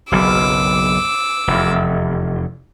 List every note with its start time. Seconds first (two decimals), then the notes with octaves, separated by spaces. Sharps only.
0.12 F#1 B1 D6 E6
1.47 F1 E2